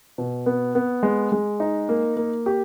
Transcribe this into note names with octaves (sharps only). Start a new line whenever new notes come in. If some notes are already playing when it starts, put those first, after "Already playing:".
B2
B3
B3
G#3
G#3
D#4
A#3
A#3
G4